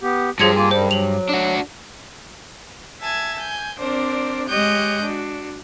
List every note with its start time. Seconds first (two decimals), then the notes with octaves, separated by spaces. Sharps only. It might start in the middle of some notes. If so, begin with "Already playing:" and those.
0.01 B3 G4
0.39 G2 F3 F#3 F4 G#4 G#6 C#7
0.55 A#3 F4 G#5
0.71 F#2 G3 C5
0.91 F#3 F7 F#7
1.29 D4 F#4
3.01 E5 G#5 A5 G#6
3.38 G#5 G6
3.78 C4 D4 A#4 C5 D5
4.48 G#3 G4 C#5 D#5 F#6 G6
5.02 D4 F#4